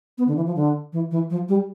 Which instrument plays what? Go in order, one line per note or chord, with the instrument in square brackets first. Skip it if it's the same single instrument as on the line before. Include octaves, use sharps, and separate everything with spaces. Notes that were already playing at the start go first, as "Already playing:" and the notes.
[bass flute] B3
D3
E3
F3
D3
E3
E3
F3
G3